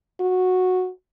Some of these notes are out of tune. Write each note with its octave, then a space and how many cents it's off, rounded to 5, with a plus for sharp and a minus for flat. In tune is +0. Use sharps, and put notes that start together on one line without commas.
F#4 -10